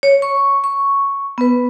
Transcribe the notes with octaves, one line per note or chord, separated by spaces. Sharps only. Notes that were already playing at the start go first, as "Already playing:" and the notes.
C#5
C#6
C#6
B3 B4